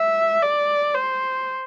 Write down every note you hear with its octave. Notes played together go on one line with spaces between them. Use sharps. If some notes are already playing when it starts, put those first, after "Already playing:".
Already playing: E5
D5
C5